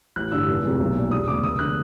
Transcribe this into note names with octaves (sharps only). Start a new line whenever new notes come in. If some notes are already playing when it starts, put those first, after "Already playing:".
A1 F#6
G2 D3 G3 E6
F1
F2 C3 F3 G#3
B1
A#2 G3
E1 D#6
D2 C#3 D6
F1 D#6
D3 F#6